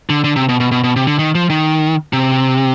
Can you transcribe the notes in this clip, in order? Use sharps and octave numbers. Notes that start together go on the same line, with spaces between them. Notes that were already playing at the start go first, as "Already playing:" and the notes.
D3
D3
C3
B2
B2
B2
B2
C3
D3
D#3
F3
D#3
C3